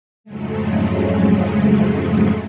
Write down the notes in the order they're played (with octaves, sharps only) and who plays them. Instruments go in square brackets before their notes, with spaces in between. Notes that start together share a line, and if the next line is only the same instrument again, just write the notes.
[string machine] F2 G#2 C#3 F#3 G#3 A3